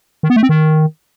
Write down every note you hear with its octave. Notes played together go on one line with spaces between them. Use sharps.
D#3
B3
A3
C4
D#3